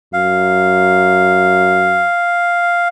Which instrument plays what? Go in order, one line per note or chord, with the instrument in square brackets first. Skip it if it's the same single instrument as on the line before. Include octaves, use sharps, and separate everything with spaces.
[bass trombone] F#2 [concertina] F5